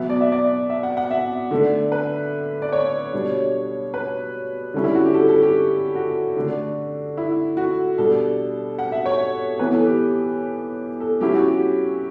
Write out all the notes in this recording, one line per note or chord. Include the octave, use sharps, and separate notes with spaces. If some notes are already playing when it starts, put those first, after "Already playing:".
Already playing: B2 F#3 B3 E5
D5
E5
D5
E5
F#5
F#5
E5
D3 A3 D4
B4
D5
C#5
B2 G3 D4
B4
D3 G3 C#4 E4
E4
F#4
G4
A4
A4
G4
F#4
D3 A3 D4
E4
F#4
B2 G3 D4 A4
F#5
E5
C#5
E3 B3 E4 B4
A4
G4
A4
F#3 C#4 E4 G4
F#4
G4